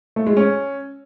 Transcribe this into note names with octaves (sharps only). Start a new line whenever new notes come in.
A3
G#3
C#4